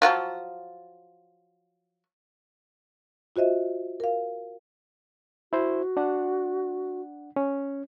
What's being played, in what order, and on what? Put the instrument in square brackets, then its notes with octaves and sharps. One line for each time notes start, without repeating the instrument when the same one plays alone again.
[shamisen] F3 F#3 F4
[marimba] F4 F#4 C5 D#5 E5
A#4 F5
[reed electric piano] E4 C5 [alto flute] F#4
[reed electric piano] D4 F#5
C#4